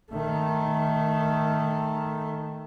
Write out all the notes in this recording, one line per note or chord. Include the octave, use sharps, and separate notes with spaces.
D#3 A3